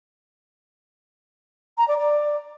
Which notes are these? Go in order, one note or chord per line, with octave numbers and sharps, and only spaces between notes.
A#5
D5
D5